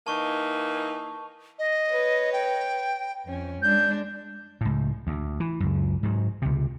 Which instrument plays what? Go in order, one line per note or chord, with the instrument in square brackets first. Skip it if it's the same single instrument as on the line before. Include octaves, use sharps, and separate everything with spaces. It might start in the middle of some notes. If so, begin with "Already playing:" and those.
[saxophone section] E3 A#3 D#4 [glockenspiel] A5 C#6
[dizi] D#5
[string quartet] B4 C#5
[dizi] G5
[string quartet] F2 C#4
[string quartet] G#3 D4 [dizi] G6
[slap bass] C#2 A2
D2
E3
C#2 F#2
G#2 F#3
C#2 C3